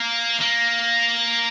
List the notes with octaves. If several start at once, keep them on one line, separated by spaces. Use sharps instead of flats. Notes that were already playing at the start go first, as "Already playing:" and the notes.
Already playing: A#3
A#3